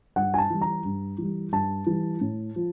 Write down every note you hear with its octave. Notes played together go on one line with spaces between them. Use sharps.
G2 F#5
G#5
A5
E3 G3
A#5
G2
E3 G3
G2 A5
E3 G3
A2
F3